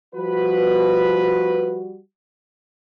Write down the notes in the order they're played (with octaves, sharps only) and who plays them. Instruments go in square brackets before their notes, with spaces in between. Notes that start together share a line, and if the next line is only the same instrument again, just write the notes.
[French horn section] F3 G3 F#4 [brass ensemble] B4